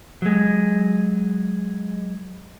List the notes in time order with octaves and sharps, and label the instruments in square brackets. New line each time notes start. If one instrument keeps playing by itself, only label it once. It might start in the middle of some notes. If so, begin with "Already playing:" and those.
[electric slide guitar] F#3 G#3